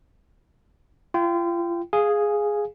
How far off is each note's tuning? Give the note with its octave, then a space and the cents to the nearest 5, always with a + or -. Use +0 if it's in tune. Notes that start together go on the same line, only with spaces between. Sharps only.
F4 -35 G5 -10
G#4 +0 F5 +0 G#5 +0